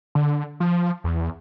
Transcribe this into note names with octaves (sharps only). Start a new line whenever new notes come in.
D3
F3
E2